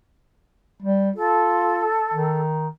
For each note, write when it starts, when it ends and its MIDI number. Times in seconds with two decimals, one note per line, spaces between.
0.83 1.10 55
1.16 1.86 65
1.16 2.38 69
2.14 2.68 51